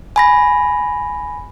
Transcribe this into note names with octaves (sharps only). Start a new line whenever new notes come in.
G#5 B5 A#6